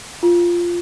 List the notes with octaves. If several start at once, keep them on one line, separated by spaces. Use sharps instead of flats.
F4